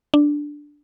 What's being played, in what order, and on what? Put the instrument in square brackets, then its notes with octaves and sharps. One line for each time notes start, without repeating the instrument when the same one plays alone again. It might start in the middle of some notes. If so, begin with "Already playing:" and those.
[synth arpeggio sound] D4